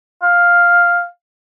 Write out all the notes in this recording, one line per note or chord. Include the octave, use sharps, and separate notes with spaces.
F5